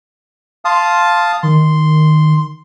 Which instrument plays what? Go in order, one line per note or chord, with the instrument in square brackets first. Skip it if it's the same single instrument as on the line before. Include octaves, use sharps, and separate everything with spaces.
[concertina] F5 A5 D#6 [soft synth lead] C6
[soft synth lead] D#3 [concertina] C6